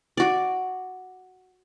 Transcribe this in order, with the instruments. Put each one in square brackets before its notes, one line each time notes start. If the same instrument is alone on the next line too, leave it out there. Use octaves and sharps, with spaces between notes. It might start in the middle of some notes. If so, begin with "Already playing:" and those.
[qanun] F#4 D5